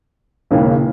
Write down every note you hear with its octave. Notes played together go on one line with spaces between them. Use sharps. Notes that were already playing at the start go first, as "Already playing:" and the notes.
E1 D#2 C#3 E3 A#3